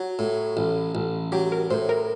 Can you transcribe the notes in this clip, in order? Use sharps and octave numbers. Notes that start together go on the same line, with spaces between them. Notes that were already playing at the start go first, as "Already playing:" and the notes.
Already playing: F#3 F#4
A2
A1
A1
F#3 G4
A#4
A2 C5
A#4